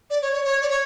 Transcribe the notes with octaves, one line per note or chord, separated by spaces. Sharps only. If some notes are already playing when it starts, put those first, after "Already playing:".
D5
C#5
C#5
C#5
D5
C#5